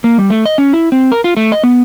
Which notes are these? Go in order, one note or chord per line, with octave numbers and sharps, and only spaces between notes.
A#3
G3
A3
D#5
C#4
E4
C4
A#4
F4
A3
D#5
B3